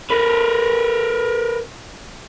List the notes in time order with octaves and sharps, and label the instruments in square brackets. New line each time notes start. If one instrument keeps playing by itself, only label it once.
[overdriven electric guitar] A#4 B4